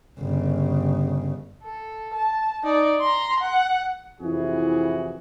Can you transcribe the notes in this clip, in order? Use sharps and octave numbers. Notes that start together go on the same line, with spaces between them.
G1 C#3
A4
A5
D#4 D5
A#5 C6
F#5
F2 C3 E3 E4 F#4 G#4